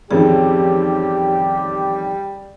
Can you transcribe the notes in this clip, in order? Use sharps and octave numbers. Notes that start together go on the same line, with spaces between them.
A1 F2 D#3 G3 G4 G#4